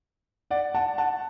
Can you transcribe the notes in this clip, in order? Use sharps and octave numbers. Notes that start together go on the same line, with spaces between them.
D5 F#5
F#5 A5
F#5 A5